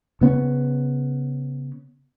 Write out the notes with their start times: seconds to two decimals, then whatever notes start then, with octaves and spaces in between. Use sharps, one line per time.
0.21 C#3 B3 C#4